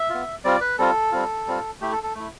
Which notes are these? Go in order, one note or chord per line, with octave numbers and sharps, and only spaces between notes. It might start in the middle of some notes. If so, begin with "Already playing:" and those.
Already playing: E5
B3 F4
G3 C4 F4 D5
B4
G3 C4 F4 A4
G3 C4 F4
G3 C4 F4
A3 E4 G4
A4
A4
A3 E4